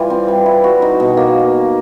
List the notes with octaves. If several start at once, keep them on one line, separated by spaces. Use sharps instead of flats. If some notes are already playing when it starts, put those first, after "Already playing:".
Already playing: E3 G3 F4
C4
G3
E4
F#4
D#4
B2
A#3